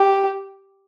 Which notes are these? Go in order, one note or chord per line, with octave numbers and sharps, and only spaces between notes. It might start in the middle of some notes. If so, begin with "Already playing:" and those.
Already playing: G4